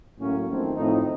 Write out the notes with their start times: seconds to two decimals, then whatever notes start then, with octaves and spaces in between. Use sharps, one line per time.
0.19 A2 F#3 A#3 C#4
0.48 F2 D#3 A3 C4
0.76 A2 F3 C4 D#4